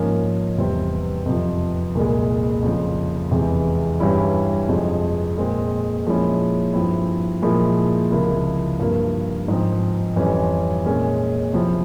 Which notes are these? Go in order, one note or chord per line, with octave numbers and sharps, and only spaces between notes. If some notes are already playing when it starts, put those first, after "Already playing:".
Already playing: G#2 F3 A#3 C#4
E2 C3 G3 C4
F2 C3 F3
C2 A#2 G#3
F2 C#3 F3
E2 C3 E3 G#3
G2 E3 G3 C#4 E4
F2 C3 F3 G#3
A#2 G#3 C4
A#2 F3 G#3 C#4 E4
G2 F3 C4 E4
A#2 F3 G#3 E4
C#2 C3 F3 A#3 E4
G2 F3 A#3
G#2 F3 C4
F2 E3 G3 C#4
A#2 G#3 C#4
C3 F3 C4 E4